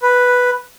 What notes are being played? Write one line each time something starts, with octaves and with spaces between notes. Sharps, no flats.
B4